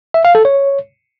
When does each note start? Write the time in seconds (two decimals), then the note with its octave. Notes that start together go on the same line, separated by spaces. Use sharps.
0.14 E5
0.25 F5
0.35 A4
0.45 C#5